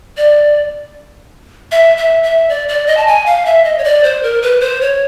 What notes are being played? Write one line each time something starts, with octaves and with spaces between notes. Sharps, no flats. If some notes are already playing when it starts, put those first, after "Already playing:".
D5
E5
E5
E5
D5
D5
D#5
A5
G#5
F5
E5
D#5
C#5
D5
C5
A#4
B4
C5
C#5